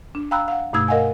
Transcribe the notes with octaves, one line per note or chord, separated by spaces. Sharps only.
D4
F5 G5 A#5 B5 E6 F#6
F5 F#5
G2 B2 A3 D#4 E6 G#6
A#4 D#5 F5 F#5 G#5